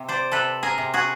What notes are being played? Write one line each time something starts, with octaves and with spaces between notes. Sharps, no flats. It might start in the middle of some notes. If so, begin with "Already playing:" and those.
Already playing: C3
C5 D5
C3 A4 B4
G#4 A#4
C3
F#4 G#4